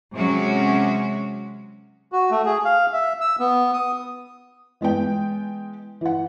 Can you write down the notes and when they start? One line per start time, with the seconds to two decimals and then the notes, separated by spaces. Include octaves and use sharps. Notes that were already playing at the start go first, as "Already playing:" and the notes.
0.15 C3 F#3 G#3 C#4 F#4
2.12 F#4
2.31 A3
2.45 G#4
2.65 F5
2.93 E5
3.21 E6
3.39 B3
3.73 D#6
4.81 E3 G#3 B3 G5
6.01 E3 F#5